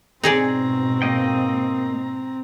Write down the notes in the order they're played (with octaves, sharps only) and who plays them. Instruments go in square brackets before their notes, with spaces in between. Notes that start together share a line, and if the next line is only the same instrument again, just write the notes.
[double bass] G#2 B2 [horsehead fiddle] C4 A#5 [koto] D#4 G#4 D5
[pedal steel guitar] A#3 D#5 G5